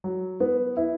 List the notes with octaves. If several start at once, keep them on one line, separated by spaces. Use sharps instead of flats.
F#3
B3
E4